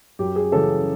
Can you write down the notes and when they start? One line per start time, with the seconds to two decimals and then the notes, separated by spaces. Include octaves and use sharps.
0.19 F#2 G4
0.36 G#4
0.52 C#3 E3 A4